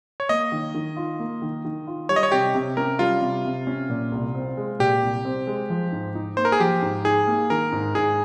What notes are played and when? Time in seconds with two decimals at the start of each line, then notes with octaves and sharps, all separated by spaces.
0.20 C#5
0.29 A#3 D#5
0.52 D#3
0.75 D#3
0.97 F4
1.19 A#3
1.42 D#3
1.65 D#3
1.87 F4
2.09 G3 C#5
2.16 D#5
2.23 C#5
2.32 C3 G4
2.54 C3
2.77 C#4 A#4
2.99 G3 F4
3.22 C3
3.45 C3
3.67 C#4
3.90 A#2
4.12 C2
4.35 C4
4.57 G#3
4.79 A#2 G4
5.02 C2
5.25 C4
5.47 G#3
5.70 F3
5.92 G#2
6.15 D#4
6.37 A#3 C5
6.45 A#4
6.52 G#4
6.60 F3 G4
6.82 G#2
7.05 D#4 G#4
7.28 A#3
7.50 D#3 A#4
7.72 G#2
7.95 G#2 G#4